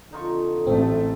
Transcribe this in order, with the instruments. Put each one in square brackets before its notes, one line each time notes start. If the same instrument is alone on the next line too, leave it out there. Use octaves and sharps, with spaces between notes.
[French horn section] F2 D3 A4 [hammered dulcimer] D#4 F4 C#6
[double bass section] A1 A3 [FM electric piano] C4